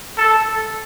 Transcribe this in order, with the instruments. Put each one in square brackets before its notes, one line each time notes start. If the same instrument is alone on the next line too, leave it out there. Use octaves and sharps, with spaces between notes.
[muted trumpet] A4